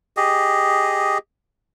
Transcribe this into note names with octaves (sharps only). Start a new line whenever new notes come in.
G4 G#4 D#5